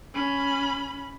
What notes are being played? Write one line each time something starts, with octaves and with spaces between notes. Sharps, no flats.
C#4 B5